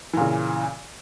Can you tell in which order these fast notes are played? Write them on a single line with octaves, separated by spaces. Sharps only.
E3 A#2 C#3